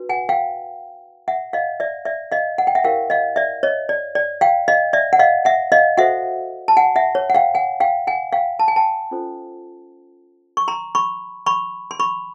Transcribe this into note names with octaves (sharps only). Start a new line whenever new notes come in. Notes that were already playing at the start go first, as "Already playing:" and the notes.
Already playing: D4 F#4 B4
F#5 G#5
F5 G5
E5 F#5
D#5 F5
D5 E5
D5 E5
D#5 F5
F#5
G5
E5 F#5
E4 G4 A#4 C#5 F5 G5
D#5 F5
D5 E5
C#5 D#5
D5
D5
F5 G5
D#5 F5
D5 E5
F#5
D#5 F5
E5 F#5
D#5 F5
F#4 A4 C5 E5 F#5
A5
F#5 G#5
E5 F#5
C#5
F#5
F5 G5
F#5 G#5
F5 G5
F#5 G#5
F5 G5
A5
G#5
G5 A5
C#4 F4 A4 C5
C#6
A#5 C6
B5 C#6
B5 C#6
C6
B5 C#6